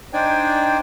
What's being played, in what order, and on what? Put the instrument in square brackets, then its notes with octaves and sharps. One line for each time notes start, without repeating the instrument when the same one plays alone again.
[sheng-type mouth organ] D4 D#4 C5 D5 G5 G#5